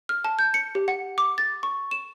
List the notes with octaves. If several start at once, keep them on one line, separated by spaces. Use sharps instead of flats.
F6
A5
G6
C#7
G4
F#5
D6
A6
C#6
E7